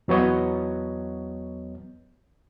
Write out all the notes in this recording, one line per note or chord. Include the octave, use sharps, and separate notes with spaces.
E2 F#3 B3 C#5 D#5